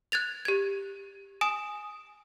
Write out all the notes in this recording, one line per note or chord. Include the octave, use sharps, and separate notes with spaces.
F#6 G#6 A6 F7
G4 G#6
G#5 D#6 E7